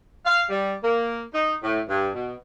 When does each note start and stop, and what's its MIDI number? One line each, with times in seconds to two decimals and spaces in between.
0.25 0.44 77
0.49 0.73 55
0.83 1.23 58
1.33 1.54 63
1.63 1.80 45
1.89 2.08 43
2.14 2.33 47